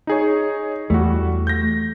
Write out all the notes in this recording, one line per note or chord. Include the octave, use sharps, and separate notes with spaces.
D#4 G#4 C#5
E2 G3 A3 F#4
G6 A#6